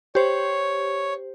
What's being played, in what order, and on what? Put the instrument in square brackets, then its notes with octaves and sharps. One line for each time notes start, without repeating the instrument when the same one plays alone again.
[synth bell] G4 C5 [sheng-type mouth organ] C#5